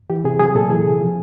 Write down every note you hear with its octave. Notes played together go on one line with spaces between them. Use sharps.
E3 G4
C3 G#4
F#3 G#4
A#2 A4
E3 G#4
C3
F3